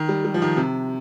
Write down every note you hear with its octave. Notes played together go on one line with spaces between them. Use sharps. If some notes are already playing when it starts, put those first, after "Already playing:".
Already playing: D#3
G3
G3
F3
D#3
C3